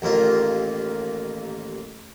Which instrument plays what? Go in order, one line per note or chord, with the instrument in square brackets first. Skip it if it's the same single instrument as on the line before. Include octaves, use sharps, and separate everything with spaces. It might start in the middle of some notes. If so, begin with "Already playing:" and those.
[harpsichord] A1 D#2 A#3 F4